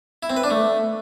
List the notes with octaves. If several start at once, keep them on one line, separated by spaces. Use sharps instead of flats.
E4
C4
B4
D4
A3